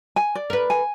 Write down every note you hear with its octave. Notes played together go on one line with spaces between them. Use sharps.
G#5
D5
A#4 B4
G#5